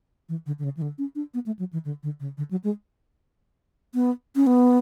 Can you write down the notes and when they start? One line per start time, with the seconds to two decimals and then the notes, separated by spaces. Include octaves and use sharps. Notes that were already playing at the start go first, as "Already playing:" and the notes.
0.29 E3
0.46 D3
0.59 D3
0.64 C#3
0.77 E3
0.82 D3
0.98 C#4
1.15 D4
1.34 B3
1.46 A3
1.59 F#3
1.73 E3
1.85 D3
2.03 D3
2.20 C#3
2.38 D3
2.51 F#3
2.64 G#3
3.94 B3
4.36 C#4
4.47 B3